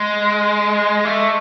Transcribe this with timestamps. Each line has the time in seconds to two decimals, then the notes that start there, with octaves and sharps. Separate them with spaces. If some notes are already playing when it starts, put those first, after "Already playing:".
Already playing: G#3
1.05 A3